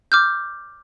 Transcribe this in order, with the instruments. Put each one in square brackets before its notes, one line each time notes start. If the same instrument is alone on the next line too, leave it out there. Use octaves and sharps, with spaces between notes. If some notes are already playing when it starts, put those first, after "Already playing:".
[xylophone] D6 F6 G6